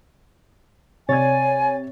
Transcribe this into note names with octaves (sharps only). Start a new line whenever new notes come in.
C3 C#5 D5 G#5 G#6 A6